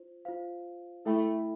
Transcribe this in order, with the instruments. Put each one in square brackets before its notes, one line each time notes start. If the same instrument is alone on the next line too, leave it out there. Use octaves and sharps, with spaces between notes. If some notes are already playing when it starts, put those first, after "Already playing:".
Already playing: [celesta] F4 C5
F4 C5 F5
[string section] A3 [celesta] E4 A4 E5 G5 B5